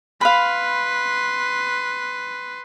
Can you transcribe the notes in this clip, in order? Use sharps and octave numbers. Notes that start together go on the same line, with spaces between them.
B4 F5 B5 C6